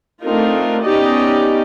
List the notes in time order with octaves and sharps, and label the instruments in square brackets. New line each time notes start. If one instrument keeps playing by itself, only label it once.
[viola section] A3 C4 D4 D#4 F4 A#4
B3 C#4 D#4 G4 D5 D#5